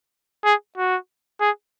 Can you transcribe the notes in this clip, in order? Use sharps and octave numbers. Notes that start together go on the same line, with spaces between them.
G#4
F#4
G#4